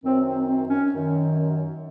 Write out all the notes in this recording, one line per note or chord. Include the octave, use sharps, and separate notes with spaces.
F#2 D#3 C4
C4
C4
C#4
F#2 D#3